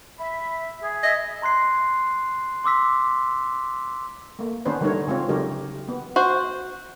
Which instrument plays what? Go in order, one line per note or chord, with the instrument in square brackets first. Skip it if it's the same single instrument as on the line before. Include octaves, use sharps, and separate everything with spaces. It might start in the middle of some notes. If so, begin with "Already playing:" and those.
[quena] E5 [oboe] B5
[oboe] G#4
[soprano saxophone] D#5 [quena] E5
[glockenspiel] A#5 C6 F#6 C7
C6 D6 E6 B6
[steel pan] A3 A#3
D#3 B3 C#4 D4 B4 C5
D3 G3 A3 D#4 A#4 C#5
C#3 G#3 C4 F4 C#5
C#3 F#3 A3 D#4 G4 A#4
B3
[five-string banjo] F#4 C5